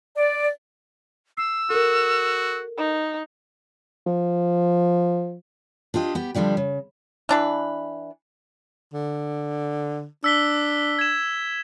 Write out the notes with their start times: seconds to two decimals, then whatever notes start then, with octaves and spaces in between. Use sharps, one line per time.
0.16 D5
1.37 E6 C7
1.70 F#4 A4 A#4
2.78 D#4
4.06 F3
5.94 D4 F4 G4 D#5
6.15 B3 G4
6.34 D3 F3 G3 D4 G4
6.57 C#3
7.29 E3 D4 B4
8.94 D3
10.24 D4 E6 B6 G7
10.99 G#6 E7